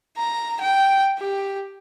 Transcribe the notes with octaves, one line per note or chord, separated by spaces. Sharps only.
A#5
G5
G4